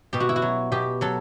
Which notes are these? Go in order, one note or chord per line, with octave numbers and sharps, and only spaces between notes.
B2 G4
F#4
E4
F#4
F#3
B2 G4
F#3 A4